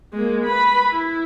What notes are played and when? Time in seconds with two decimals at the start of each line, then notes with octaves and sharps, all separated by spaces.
0.13 G#3 A#3
0.45 B4 B5
0.90 E4